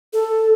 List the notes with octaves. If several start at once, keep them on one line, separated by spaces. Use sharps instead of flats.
A4